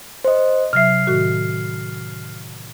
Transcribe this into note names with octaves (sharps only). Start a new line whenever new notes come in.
C5 D#5
C3 F#3 E5 F6 C7
A2 D#3 F#4